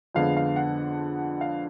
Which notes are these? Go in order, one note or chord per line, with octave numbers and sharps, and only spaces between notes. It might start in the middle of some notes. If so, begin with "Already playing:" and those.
F2 D3 G#3 B3 F5
F5
F#5
F5